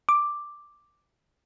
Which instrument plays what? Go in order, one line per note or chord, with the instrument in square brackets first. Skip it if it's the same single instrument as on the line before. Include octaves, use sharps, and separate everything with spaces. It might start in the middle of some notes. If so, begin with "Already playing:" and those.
[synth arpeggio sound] D6